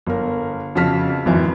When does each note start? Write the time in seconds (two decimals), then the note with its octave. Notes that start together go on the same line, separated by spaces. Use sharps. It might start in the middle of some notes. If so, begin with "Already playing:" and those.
0.07 G1 A#4
0.75 F2 C#3 F#4 A5 F6 B6
1.25 G#1 F2 E3